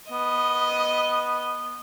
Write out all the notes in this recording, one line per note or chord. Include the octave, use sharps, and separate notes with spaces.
B3 D#5